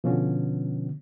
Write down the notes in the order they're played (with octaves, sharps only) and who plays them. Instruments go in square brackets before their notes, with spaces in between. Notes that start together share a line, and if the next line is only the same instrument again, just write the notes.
[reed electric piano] B2 D3 F3 B3 C#4